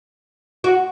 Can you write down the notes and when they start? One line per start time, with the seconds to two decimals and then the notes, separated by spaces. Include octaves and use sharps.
0.64 F#4